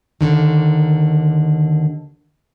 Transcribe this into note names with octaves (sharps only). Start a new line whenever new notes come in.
D#2 A#2 D3 D#3